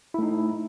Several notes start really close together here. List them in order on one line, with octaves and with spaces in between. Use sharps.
E4 A3 D#4